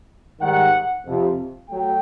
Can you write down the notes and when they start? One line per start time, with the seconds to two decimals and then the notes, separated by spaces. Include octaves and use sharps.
0.40 G#2 D#3 G3 F#5
1.05 F2 C3 F3
1.69 F#3 A3 G5